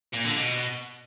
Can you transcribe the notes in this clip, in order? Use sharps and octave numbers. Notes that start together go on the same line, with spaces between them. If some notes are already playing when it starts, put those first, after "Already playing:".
A#2
D3
B2